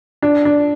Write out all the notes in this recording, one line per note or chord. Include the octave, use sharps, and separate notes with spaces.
D4
D4